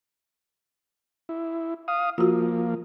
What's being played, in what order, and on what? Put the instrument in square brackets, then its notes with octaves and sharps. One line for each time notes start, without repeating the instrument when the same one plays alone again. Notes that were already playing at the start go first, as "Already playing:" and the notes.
[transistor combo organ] E4
F5 D#6
[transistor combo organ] F3 A#3 [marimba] F4 F#4